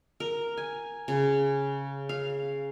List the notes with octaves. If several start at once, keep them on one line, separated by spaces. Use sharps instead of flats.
A#4
G#5
C#3
F5